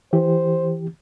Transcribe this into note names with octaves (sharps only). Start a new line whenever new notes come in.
E3 G4 C5